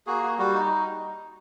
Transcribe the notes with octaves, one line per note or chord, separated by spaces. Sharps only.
A#3 F#4 G#4
F#4
G3 F#4
D#4